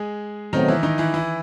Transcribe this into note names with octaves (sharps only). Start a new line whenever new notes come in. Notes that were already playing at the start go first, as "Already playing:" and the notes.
Already playing: G#3 G#4
B2 D#3 F#3 A3 C4 D#4
E3 E4
D#3 D#4
E3 E4
E3 E4